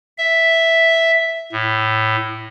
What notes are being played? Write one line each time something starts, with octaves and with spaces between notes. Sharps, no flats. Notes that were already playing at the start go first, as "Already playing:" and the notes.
E5
A2